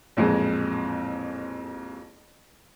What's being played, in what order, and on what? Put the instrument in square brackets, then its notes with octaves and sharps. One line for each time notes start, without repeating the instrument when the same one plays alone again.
[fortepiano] A1 F2 A#2 G#3